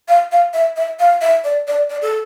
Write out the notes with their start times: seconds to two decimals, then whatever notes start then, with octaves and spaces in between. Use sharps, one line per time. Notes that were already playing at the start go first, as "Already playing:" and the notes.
0.08 F5
0.32 F5
0.54 E5
0.76 E5
1.00 F5
1.21 E5
1.44 D5
1.68 D5
1.90 D5
2.02 A4